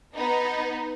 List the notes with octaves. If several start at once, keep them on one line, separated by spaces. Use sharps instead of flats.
B3 D#4